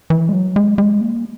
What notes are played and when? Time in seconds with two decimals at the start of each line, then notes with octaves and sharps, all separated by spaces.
0.10 E3
0.29 G#3
0.33 F#3
0.56 G#3
0.78 G#3
1.01 A#3